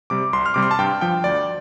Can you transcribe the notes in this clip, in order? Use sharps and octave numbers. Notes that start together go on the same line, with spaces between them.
C3 G3 D6
C2 C6
F6
C3 G3 D6
C6
A5
G2 G5
F3 G5
D2 D5